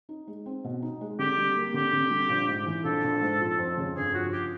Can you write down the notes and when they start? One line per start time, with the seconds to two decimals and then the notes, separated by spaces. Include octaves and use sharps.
0.09 D#4
0.27 G#3
0.46 C4
0.64 B2
0.82 D#4
1.01 G#3
1.19 D3 G4
1.38 G3
1.57 A#3
1.74 D3 G4
1.93 D3
2.11 G3
2.29 A#1
2.48 G#2
2.66 E3
2.85 A#1 A4
3.04 A#1
3.22 G#2
3.41 F3
3.58 F2
3.77 C#3
3.96 G1 G#4
4.14 F3 F#4
4.32 G4